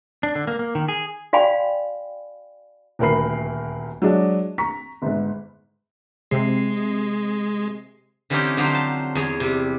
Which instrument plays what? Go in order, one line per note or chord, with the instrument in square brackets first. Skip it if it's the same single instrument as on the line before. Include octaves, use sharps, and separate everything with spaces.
[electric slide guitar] D4
D3
A#3
A#3
D#3
G#4
[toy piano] F#4 D5 F5 G5 G#5 B5
[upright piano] D#1 D2 A#4 B4 B5 C7
F#3 G#3 D4 D#5
A#5 C#6 B6
G1 G#2
[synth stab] C3 C7 [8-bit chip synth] G#3
[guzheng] D3 E3 C4 C#4 D#4 G4
D3 F3 F#3 D#4 G4 C5
A5
E2 G#4 C#5
C3 G3